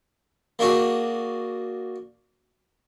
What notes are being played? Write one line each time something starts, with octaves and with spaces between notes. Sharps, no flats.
A#3 D4 F#4 G#4